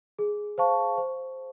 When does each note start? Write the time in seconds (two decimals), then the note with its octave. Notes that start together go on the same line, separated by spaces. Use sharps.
0.19 G#4
0.58 C5 F5 A5 C#6
0.97 C5